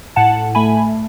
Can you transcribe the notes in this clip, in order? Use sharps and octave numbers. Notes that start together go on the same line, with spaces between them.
A2 F#5 A5
A3 G#5 B5